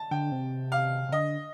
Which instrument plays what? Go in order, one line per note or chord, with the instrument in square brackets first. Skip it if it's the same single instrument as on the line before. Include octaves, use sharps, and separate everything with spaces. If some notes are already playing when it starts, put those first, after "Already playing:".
Already playing: [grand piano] A5
[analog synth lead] D3 [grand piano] G5
[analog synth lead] C3
[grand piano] F5
[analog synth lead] C3
[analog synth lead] D3 [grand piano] D#5